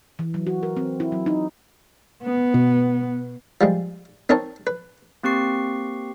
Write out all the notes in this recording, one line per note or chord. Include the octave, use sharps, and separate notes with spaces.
E3
F#3
F#4
A#4
C4
E4
F#3
D#4
B3
B2
F3 G3 G#3
C4 D#4 A#4 C#5 A5
B4
A#3 C4 G4 C#6 C7